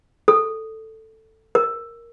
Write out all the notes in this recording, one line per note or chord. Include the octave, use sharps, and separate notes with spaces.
A4
A#4